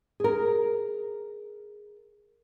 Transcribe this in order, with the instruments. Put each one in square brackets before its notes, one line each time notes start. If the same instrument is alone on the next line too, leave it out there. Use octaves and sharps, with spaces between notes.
[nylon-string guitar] G#4 A#4